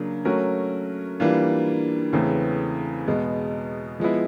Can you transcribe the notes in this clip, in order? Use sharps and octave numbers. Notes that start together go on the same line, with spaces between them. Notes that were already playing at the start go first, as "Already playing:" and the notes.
Already playing: C#3 F#3 A#3 D4
F#3 A3 C#4 F#4 A#4
E3 G3 A#3 D4 F4
E2 C#3 E3 A3 C4
E2 B2 G#3 B3
F3 G#3 B3 E4